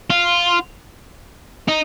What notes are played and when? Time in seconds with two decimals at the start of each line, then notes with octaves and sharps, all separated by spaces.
0.11 F4
1.68 D#4